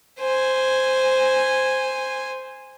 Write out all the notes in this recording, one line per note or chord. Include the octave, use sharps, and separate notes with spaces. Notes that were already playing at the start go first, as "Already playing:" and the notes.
C5 G#5